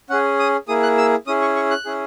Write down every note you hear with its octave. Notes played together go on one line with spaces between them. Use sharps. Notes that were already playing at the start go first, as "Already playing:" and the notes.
C#4 G#4 F#5
D#6
A#3 E4 G#4 D#6
F#6
E6
C#4 E4 G#4 D#6
C#6
C#6
F#6
C#4 E4 G#4